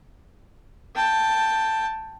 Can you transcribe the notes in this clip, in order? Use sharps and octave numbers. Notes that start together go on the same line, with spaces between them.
G5 A5